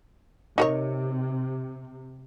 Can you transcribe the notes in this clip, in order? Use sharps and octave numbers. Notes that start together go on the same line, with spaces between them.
C3 D#4 A#4 C#5